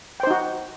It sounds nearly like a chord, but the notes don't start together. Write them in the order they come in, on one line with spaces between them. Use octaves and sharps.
G5 C5 D#4 F#4